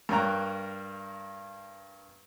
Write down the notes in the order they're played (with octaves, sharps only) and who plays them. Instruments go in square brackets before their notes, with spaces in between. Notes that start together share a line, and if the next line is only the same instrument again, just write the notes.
[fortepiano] G2 A#3 C#5 G5 A#5 F#6